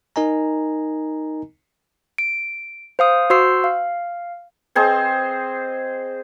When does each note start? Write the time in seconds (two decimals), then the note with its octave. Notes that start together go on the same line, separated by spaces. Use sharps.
0.16 D#4 A#4 D#5 G#5 A#5
2.18 D7
2.99 C5 F5 D#6
3.30 F#4 C5 C6 E6 C7
3.64 F5
4.75 C4 G#4 C5 D#5